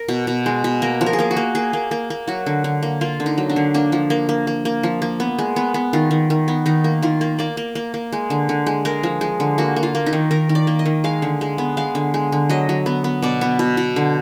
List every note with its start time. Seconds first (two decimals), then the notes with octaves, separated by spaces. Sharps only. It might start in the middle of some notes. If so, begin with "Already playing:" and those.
Already playing: A#4
0.08 B2
0.27 B2
0.46 G#3
0.64 B2
0.82 A#3 A#4
1.01 F3
1.06 A#4
1.13 G#4
1.19 A#3 A#4
1.31 F#4
1.37 A#3
1.55 A#3 G#4
1.73 A#3
1.91 A#3
2.10 A#3
2.28 F#3 F#4
2.46 D3
2.64 D3
2.83 A#3
3.01 A#3 F4
3.20 D3
3.26 D#4
3.38 F#3
3.49 D4
3.56 D3
3.74 A#3 D4
3.92 F3
4.10 A#3
4.29 A#3
4.47 A#3
4.65 A#3
4.83 F3
5.02 A#3
5.20 B3
5.39 G#3
5.56 B3
5.74 B3
5.93 D#3 F4
6.11 D#3
6.30 D#3
6.48 B3
6.66 D#3 D#4
6.84 A#3
7.03 D#3 F4
7.21 A#3
7.39 A#3 D5
7.57 A#3
7.75 A#3
7.94 A#3
8.12 G#3
8.30 D3
8.49 D3
8.66 G#3
8.85 G#3 A#4
9.03 F3
9.21 G#3
9.40 D3
9.58 A#3 F#4
9.76 A#3
9.83 F4
9.95 A#3
10.06 D#4
10.13 D#3
10.31 D#3 A#4
10.49 D#3
10.55 D5
10.67 A#3
10.79 D#5
10.86 D#3
11.04 G#3 F5
11.22 D3
11.41 G#3
11.58 B3
11.77 G#3 F5
11.95 D3
12.14 G#3
12.32 D3
12.49 F#3 D#5
12.69 F#3
12.86 B3
13.04 B3
13.22 B2 D5
13.41 B3
13.59 B2
13.77 B2
13.96 D3